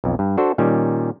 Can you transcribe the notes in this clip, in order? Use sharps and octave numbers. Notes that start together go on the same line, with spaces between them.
B1 F2
G2
D4 F#4 A4 C5
A#2 D#3 G3 C#4